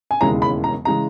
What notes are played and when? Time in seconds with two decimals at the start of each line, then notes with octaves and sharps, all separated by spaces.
0.11 G#5
0.21 E1 D#2 C#3 E3 G#3 A#5
0.42 B5
0.64 A#5
0.85 C#3 E3 G#3 A#5